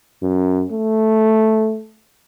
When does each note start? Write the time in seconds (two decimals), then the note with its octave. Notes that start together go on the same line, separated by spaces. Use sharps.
0.22 F#2
0.72 A3